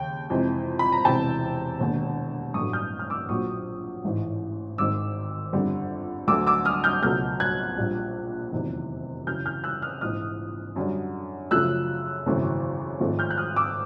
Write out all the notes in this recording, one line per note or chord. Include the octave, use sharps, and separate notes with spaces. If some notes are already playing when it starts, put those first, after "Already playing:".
Already playing: D#2 C#3 G5
F2 C3 E3 G#3
B5
A#5
E1 E2 C3 E3 G5 A5
E1 D#2 D3
A1 G2 D3 F#3 A3 C#6 D#6
F6 G6
F6
D6 E6
A#1 A#2 F#3 C#6 D#6
A1 G#2 E3
G#1 G#2 D#3 D6 E6
G1 F2 D3 G3
D2 D3 F#3 A3 D6 E6
D6 E6
D#6 F6
F6 G6
C#2 B2 F#3 A3 F6 G6
F#6 G#6
A#1 A#2 G3
F1 E2 C3 D#3 F#3
F#2 C#3 E3 F6 G6
F6 G6
E6 F#6
D#6 F6
A#1 G#2 E3 D#6 F6
F#2 D3 G3
F#2 C#3 F3 A3 E6 F#6
G#1 F#2 C#3 E3 A3
G#1 G#2 F3 A3
F6 G6
F#6
D#6 F6
D6 E6